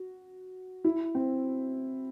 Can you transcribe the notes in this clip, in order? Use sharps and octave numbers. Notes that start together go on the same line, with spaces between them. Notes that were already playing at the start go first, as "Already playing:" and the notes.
Already playing: F#4
E4
C4